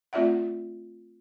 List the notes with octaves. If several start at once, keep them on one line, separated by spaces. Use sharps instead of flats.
A3 C4 F4 D5 E5 F#5